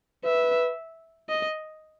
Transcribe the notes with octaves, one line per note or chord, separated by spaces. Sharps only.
B4 E5
D#5